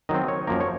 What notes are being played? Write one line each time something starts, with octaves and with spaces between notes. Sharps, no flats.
D#3 F#3 C4 D#5
C#5
F#2 F3 A#3 A#4
C#5